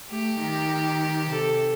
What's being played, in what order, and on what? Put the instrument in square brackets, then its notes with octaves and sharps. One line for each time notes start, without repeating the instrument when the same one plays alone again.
[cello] A3 [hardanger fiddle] G4
[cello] D#3
[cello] C3 [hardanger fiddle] A4